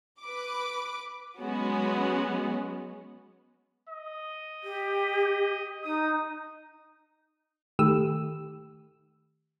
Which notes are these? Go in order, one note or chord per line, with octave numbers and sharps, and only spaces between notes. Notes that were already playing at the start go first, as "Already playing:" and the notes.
B4 D6
F#3 G#3 B3 C#4 F#4
D#5
G4
D#4 D#6
D#3 A3 G4 E6